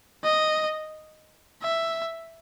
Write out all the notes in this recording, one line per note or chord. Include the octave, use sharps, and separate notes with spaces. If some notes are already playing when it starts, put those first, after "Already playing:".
D#5
E5